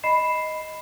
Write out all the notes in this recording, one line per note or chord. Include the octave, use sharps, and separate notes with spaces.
D#5 B5 C7 E7